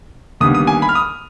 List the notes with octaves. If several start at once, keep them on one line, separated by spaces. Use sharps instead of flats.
D#2 D3 G3 B3 D#6
D#6
G#5
B5
F6
D#6